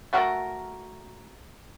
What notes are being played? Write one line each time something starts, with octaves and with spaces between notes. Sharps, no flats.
A3 F#4 A4 A#4